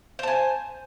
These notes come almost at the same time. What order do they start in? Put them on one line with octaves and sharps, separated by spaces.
C5 A5 G#5